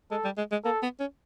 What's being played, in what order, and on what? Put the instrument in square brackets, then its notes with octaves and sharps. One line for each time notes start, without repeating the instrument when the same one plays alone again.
[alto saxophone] G#3 [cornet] A4
[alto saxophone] G3
G#3
G#3
[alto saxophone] A#3 [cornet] A4
[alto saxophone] B3
C#4